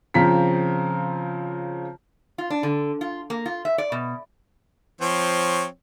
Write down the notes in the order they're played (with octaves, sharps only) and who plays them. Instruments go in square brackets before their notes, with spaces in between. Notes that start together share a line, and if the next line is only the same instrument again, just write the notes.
[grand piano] C#3 F3 C4 A#5 B6
[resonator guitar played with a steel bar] F4
D4
D3
F4
A#3
F4
E5
D5
B2
[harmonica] F3 C4 C#5